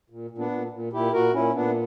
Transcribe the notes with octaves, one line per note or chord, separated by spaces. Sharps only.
A#2
A#2
B3 D4
A#2
A#2
A#2 E4 G4
A#2 F#4 A#4
A#2 C#4 E4
A#2 B3 D4